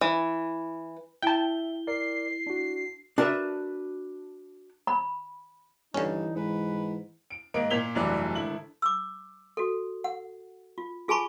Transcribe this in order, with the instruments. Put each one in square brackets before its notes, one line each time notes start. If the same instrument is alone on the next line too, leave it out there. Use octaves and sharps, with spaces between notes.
[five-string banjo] E3
[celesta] E4 G7 [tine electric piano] E5 [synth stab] G5 A5
[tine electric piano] A#4 D5 [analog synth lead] C7
[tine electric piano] D4 F#4
[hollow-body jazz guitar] D4 F#4 A#4 B4 E5
[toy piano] B5
[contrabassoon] G2 [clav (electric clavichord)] D3 C#4 [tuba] E3 [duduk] D#4
[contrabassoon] G#2 [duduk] B4
[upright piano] D7
G#2 A#3 D#5 D7
A#2 A#3 G#6 B6 F7 G7
F1 G2 E3 F#3 B4 D5
G#1 D3 E4 F#7
[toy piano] D6 E6
F#4 A4
F#5
F4
F4 G#4 G#5 A5 B5 C#6